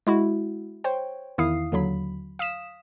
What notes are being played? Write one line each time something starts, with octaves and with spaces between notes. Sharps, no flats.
G#3 E4 F#4
C5 C#5 G5
E2 D#3 E4 F5 D#6 C7
D#2 D3 F#3 B5
F5 D#6 B6 E7